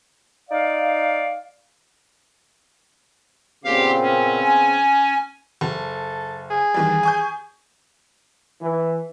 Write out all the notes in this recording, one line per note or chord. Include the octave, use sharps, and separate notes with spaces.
D#4 D5 F5
A#2 C#3 B3 C4 G4 F5
C#4
G#5
F#1 A4
G#4
D#3 E3 G3
G#5 C#6 G6
E3